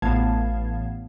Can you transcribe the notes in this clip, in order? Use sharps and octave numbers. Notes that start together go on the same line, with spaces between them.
A1 A2 B3 F5 A5 G#6